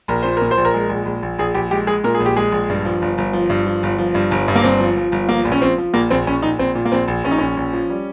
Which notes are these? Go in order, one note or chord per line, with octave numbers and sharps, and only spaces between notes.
A#1 A#4
A#2 C5
A#2 A#4
C5
A#1
A#4
G#3
A#1
A#1
A#1
A#1 G#4
A#1 G4
G#3 G4
G#3 G#4
A#2 A#4
G#4
A#1
G4
G#3 G#4
A#1
G2
F3
G1
G1
F3
G2
F3
G1
F3
G2
G1
G2
A#3
G1 C4
F3
F3
G1
F3 A#3
A#1
C#4
F3 C4
F3
A#1 A#3
A#1 C4
A#1 C#4
A#1 D#4
A#1 C4
A#2
A#3
A#1 C4
A#1
A#1 C#4
D#4
A#1 C#4
A#1
F3
G3